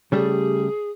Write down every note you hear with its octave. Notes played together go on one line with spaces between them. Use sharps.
C#3 G3 A3 G4 G#4